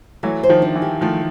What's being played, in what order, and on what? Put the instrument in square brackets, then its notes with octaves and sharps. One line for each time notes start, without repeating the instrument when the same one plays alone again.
[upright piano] E3 F#3 [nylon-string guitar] A3
[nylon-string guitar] C5
[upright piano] D#3 F3
[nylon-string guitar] D4
[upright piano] E3
[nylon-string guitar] G4
[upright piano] D#3 F3 [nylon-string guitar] A3